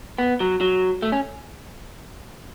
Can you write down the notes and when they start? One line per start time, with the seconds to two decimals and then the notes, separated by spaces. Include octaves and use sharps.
0.18 B3
0.40 F#3
0.61 F#3
1.02 A3
1.12 C#4